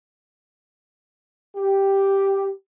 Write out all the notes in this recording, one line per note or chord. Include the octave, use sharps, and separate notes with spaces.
G4